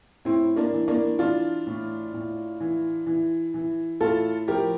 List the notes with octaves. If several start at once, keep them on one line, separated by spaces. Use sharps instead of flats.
A2 C4 E4
A#3 D4
E3
A#3 D4
E3 D4 F4
A2
A2
E3
E3
E3
A2 F4 A4
F3 G4 A#4